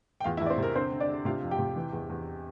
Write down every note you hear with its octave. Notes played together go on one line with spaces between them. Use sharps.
G5
E2 F4 F5
E4 E5
E2
D5
C4 C5
C3 A#4
D3 C4 C5
D3
D4 D5
D3
C3 F4 F5
F2
G4 G5
C3
E3
E2
E2